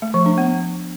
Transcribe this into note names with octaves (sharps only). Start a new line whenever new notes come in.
A3
F3
D4
B3